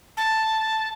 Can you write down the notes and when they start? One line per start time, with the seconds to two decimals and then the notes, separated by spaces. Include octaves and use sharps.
0.17 A5